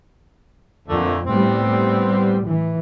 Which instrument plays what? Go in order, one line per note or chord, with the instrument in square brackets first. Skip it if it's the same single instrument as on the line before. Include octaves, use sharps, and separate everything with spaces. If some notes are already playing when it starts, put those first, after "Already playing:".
[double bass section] F2 [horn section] A#2 D3 A3
[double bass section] A2 G3 [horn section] B3 C4
[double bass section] E3